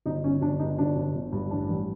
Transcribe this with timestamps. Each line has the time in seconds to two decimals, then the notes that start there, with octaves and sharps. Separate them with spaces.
0.06 G1 D#4
0.24 G1 C#4
0.41 G1 D4
0.59 G2 D#4
0.78 G1 D4
0.96 G1
1.15 G1
1.33 G2
1.51 A1 D4
1.69 A1